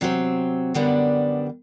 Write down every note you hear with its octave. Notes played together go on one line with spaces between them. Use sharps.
C3 F#3 C4
F#2 D3 G3 B3 D4